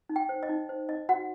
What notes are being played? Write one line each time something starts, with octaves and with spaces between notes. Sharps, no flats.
D#4
G5
C5
D#5
D#4
C5
D#4 D#5
F#4 F#5